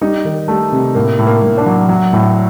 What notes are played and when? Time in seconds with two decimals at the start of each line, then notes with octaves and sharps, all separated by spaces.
0.01 G3 D#4
0.25 D#3
0.48 G3 A3
0.72 C3
0.95 A2 A#3
1.18 A2
1.27 A#3
1.42 A2
1.58 D4
1.66 F#3
1.89 F#3
2.13 A2